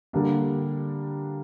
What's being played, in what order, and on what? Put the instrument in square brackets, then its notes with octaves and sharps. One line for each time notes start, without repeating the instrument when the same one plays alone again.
[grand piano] D3 G3 A#3 D4